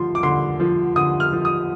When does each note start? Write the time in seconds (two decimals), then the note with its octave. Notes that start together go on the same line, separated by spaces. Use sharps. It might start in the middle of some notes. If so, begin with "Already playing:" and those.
Already playing: D3 F3 C6
0.15 D6
0.23 D3 C6
0.60 F3
0.96 D3 D#6
1.20 F6
1.32 F3
1.45 D#6